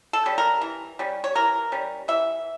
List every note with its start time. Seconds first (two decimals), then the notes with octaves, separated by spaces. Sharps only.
0.13 A4
0.26 G3 C#4
0.38 A#4
0.62 E3
0.99 G3 C#4
1.24 C#5
1.35 E3 A#4
1.72 G3 C#4
2.08 E3 E5